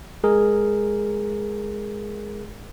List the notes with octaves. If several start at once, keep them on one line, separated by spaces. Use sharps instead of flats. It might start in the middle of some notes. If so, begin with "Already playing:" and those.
G#3 G#4 A#4